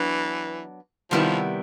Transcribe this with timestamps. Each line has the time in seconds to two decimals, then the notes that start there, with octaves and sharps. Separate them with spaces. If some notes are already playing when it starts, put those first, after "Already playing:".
Already playing: E3 F#3 B3 D4
1.10 C3 D#3 F3 G3 B3 E4